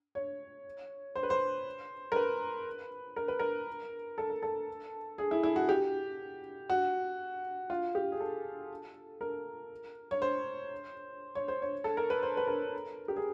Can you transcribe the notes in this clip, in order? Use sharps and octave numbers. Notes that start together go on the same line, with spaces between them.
C#5
C5
B4
C5
A#4
B4
A#4
B4
A#4
A4
A#4
A4
G#4
E4
E4
F#4
G4
F#4
F4
G4
G#4
A4
A#4
C#5
C5
C#5
C5
C#5
A4
A#4
B4
C5
B4
A#4
G4
G#4